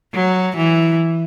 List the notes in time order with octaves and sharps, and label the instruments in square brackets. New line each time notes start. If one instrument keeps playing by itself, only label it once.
[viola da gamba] F#3
E3